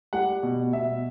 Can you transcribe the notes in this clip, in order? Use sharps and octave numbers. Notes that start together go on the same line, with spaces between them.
G3 F#5
B2
B2 E5